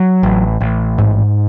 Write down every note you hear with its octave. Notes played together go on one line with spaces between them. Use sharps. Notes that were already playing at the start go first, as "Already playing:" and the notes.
Already playing: F#3
A1
A1
G#2